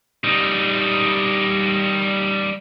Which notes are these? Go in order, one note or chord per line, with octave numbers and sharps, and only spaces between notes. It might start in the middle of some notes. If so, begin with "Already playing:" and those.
G3 D#4